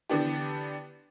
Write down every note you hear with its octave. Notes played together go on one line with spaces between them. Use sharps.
D3 E3 B3 D4 G4